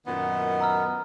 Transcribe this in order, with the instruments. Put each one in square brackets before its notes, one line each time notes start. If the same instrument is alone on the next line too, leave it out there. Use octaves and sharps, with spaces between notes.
[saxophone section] F#2 A#2 D#3 [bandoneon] B3
[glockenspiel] A#5 E6 F6